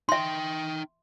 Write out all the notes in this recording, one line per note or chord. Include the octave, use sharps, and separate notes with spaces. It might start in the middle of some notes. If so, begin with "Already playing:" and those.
D#4 E5 G5 C6